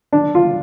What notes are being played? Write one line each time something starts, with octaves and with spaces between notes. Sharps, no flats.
D4
F4